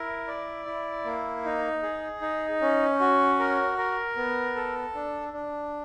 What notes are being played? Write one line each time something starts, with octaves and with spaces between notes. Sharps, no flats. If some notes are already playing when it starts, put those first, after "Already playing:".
Already playing: E4 A#4
D5
E4
A#3
D#4
G#4
D#4
C#4
F#4
A#4
A#4
B3
A4
D4
D4